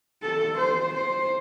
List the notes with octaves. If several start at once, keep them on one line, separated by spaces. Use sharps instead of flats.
A4
C5
C5